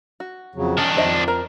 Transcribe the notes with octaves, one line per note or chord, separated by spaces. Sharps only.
F#4
F2 C#3 F#3
D#3 C#4 D4
F2 C5 D#5 E5
A#4 C5